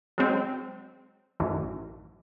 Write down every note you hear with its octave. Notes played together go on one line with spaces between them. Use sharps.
F#3 G#3 C4
A1 F#2 D#3